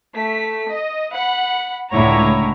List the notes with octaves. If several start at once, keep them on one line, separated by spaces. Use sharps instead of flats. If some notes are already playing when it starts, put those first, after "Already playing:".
A3 B6
D#5
F#5 B5
C#2 A2 D3 E4 C#5 A#5